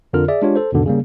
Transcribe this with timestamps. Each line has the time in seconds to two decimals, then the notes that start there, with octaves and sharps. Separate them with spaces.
0.13 F2 D3 C4 F4 A#4 F6
0.28 G#4 D5 E5
0.42 G#3 D4 F4 G4 C#5
0.55 A4 C5
0.72 E2 G#2 B2 D3 D#3
0.86 C#3 G3 A#3